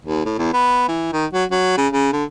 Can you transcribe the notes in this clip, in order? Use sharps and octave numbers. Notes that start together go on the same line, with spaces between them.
D#2
A2
E2
B3
E3
D#3
F#3
F#3
C#3
C#3
D3